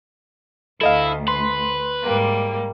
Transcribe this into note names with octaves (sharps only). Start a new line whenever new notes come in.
D2 E4 A4 D#5 F5
B4 C6
G#2 G3 A#3